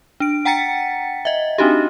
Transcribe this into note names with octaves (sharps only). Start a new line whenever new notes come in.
D4 D7
F#5 G5 A#5 A6 B6 C#7
D#5 E5
C4 D4 D#4 F#4 G4